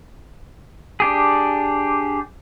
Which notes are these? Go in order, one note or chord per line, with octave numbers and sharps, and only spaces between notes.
D4 G4 G#4